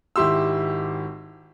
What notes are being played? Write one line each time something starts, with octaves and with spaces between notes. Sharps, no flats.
G#1 E4 G4 C6 E6